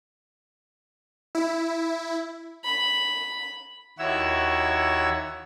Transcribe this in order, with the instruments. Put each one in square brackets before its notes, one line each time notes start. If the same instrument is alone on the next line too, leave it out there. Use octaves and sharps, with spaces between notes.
[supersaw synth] E4
[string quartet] B5
[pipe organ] D#2 E4 F#4 C#5 E6